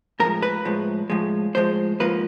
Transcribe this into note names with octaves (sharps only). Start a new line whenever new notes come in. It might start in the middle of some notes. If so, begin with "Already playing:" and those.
A2 F3 G#3 A#4
B4
A2 F3 G#3
A2 F3 G#3
A2 F3 G#3 C5
G#2 F3 A#3 B4